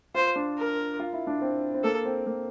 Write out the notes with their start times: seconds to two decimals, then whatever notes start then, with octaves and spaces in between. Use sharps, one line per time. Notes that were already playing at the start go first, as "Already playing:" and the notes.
0.15 F4 C5
0.36 D4
0.57 A#4
1.00 F4
1.13 E4
1.27 D4
1.41 C4
1.74 C4
1.83 A#3 A4
2.05 C4
2.26 A#3